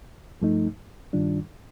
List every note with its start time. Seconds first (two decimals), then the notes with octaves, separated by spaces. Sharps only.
0.42 G2 F3 A3 D#4
1.13 G2 D#3 G3 D4 F4